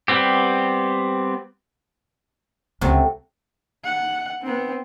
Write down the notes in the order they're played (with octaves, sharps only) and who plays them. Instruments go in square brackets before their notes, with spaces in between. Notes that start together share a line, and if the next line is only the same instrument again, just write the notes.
[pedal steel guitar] G3 B3 C4 G4
[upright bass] C#2 C#4 [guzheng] C3 F#3 A3
[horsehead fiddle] F#5
B3 C4